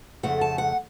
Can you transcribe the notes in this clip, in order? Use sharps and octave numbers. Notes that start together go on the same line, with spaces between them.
F2 C#3 A3 F#5
A5
F#5